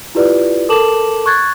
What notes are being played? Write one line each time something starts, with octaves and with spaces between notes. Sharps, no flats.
E4 F4 G4 B4 D5
A4 A#4 A5 D6 E7 F#7
C#6 F#6 G#6 A6